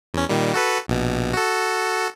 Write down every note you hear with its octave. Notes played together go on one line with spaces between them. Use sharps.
E2 C#4
A#2 D#3 G3
F#4 A4 B4
A#1 B2
F#4 A4